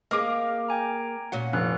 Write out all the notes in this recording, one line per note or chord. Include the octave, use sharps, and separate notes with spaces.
A#3 C4 G#4 D#5 D6 F6
G5 G#5 A#5
A#2 C#4 F#4 F#5
F1 F#6